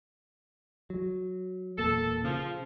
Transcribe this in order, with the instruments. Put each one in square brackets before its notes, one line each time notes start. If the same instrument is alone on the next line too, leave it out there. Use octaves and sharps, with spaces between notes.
[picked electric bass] F#3
[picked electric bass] E1 A#2 A#3 [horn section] A4
[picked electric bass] C#3 [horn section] F3